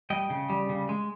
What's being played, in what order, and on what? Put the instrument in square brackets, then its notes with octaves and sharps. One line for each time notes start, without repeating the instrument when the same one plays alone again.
[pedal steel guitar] G3 D#5 G5
C#3
G3
C#3
G#3